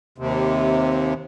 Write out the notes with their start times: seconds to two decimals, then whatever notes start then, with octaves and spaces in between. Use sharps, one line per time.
0.18 D#2 C3